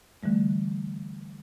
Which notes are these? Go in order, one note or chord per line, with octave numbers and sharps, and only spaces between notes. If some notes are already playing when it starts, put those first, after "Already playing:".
D3 E3 G3 A3